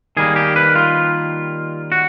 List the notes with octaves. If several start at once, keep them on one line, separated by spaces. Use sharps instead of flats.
D#3 G3 A#3 G#4
G4
B4
F4
F#4